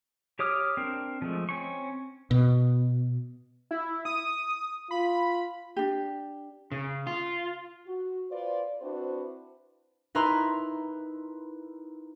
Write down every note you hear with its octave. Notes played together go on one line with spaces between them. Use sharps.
G4 C#5 D6 D#6 F6
C4 D4 A#4
F3 G#3 A3
C4 C#4 C#6
B2
E4
D#6
F4 B5
D4 G4
C#3
F4
F#4
F4 B4 C5 D5
C4 D4 E4 F#4 B4 C5
D#4 E4 A#4 B4 A#5 C6